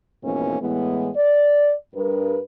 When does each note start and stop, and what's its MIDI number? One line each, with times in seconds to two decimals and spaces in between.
0.23 0.59 41
0.23 0.59 44
0.23 0.59 47
0.23 0.59 52
0.23 0.59 58
0.23 0.59 61
0.61 1.10 45
0.61 1.10 52
0.61 1.10 56
0.61 1.10 59
1.16 1.74 74
1.95 2.39 43
1.95 2.39 70
1.95 2.39 71